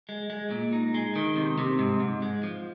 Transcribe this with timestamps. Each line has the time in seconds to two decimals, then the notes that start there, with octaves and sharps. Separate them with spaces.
0.09 G#3
0.30 G#3
0.51 A#2
0.73 D#4
0.94 G#3
1.16 D#3
1.36 C3
1.58 C3
1.79 G#2
2.00 G#2
2.22 G#3
2.43 F3